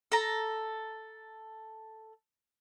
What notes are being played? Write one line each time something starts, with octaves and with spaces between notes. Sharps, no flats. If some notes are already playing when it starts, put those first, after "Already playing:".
A4 A#5